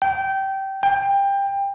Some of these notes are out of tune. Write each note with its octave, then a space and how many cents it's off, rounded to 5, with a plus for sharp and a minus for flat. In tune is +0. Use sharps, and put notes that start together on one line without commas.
G5 -20
G5 +20